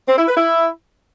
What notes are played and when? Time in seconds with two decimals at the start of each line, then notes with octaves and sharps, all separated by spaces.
0.08 C4
0.17 E4
0.27 B4
0.37 E4